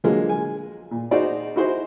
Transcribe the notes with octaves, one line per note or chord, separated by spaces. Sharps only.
D3 F3 F#3 G#3 A#3
G#5
A#2
D#4 F#4 G#4 C5 D5
D#4 E4 F#4 G#4 C5 D#5